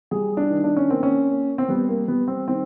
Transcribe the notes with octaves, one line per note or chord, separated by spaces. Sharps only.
G3 G#4
D4
D#3
D4
C#4
A#3 C4
C#4
A#3
C4
G3 B3
A#3
G3 B3
C4
D#3 C4